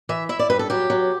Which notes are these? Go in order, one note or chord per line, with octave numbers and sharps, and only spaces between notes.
E3 E5
E4 E5
D5
G2 B4
A4
F#3 G4
F#3